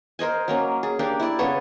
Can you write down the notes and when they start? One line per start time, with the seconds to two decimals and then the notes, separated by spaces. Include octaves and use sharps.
0.19 A#4 C5 D#5 G#5
0.48 F#3 A#3 C#4
0.83 G#4
0.99 A#3 D4 G4
1.20 E4 D5
1.39 C#3 B3 A4 C#5